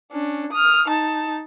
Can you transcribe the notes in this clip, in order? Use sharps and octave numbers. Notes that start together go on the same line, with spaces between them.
C#4 D4
D#6 F6
D#4 A5